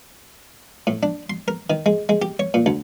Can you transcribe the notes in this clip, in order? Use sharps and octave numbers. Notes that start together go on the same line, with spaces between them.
A2
D4
C6
A#4
D#3
G#3
G#3
G4
C#5
A#2
D2